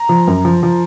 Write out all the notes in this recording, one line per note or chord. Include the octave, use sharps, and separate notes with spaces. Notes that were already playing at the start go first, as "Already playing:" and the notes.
Already playing: A#5
F3
F#2
F3
F3